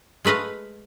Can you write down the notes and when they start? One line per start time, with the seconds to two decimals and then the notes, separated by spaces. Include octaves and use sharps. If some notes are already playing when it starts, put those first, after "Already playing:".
0.25 G#3 A3 B4 D#5 F5